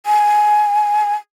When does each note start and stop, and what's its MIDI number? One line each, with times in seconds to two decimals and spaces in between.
0.06 1.14 80